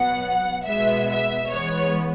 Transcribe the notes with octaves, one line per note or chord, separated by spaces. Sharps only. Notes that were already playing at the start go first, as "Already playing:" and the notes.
Already playing: B2 F#3 B3 F#5
B2 G#3 B3 E5
E5
E3 G#3 B3 C#5